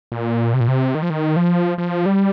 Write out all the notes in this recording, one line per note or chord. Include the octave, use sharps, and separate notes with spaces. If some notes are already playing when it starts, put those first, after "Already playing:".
A#2
C3
A#2
C3
D#3
F3
D#3
F3
F3
G3